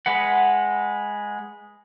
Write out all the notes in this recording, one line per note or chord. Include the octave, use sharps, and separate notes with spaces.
G#3 B4 F#5